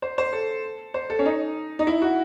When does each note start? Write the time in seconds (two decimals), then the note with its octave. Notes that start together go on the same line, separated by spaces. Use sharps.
0.02 C5
0.18 C5
0.33 A4
0.94 C5
1.10 A4
1.19 C#4
1.26 D#4
1.79 D#4
1.87 E4
2.02 F#4